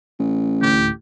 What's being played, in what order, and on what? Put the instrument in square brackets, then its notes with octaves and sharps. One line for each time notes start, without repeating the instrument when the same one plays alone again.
[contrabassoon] A1
[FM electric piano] D2 A2 [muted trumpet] G4